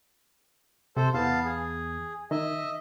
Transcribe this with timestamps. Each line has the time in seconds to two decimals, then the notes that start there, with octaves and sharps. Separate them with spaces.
0.97 C3 A4 C5
1.14 E2 B3 F5 A5
1.45 G#4
2.31 D#3 D#5 E5